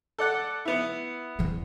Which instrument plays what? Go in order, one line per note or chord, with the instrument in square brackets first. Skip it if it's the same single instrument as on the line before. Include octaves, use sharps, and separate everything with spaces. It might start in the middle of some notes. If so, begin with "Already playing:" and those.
[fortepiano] A4 D5 F#5
B3 E4
[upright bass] E2 E3